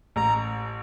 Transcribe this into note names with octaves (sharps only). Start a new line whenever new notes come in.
A1 A#5